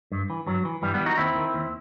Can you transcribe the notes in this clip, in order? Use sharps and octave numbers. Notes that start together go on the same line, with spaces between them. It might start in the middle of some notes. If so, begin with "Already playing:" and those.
G2
E3
G2 F#3
E3
G2 E3 G3
G3 B3
E3
D#4 F#4
D#2 C4 E4
D#3
D#2